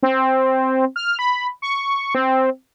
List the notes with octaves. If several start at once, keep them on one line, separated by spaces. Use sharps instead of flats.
C4
F6
B5
C#6
C4